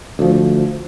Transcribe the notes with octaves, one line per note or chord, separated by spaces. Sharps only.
D2 F3